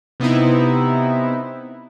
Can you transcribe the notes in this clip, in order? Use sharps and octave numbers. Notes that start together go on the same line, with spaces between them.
C3 B3 C4 D#4 E4